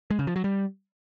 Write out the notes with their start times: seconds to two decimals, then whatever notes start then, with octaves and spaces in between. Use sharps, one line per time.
0.11 G#3
0.19 C#3
0.27 F3
0.36 F#3
0.44 G3